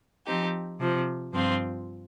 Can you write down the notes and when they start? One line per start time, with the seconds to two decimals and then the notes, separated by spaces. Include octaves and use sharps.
0.25 F3 C4 D#4 G4
0.79 C3 F3 C4
1.32 G2 F3 C4 F4